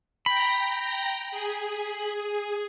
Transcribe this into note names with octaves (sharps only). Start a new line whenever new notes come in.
G5 A#5 B5 A#6
G#4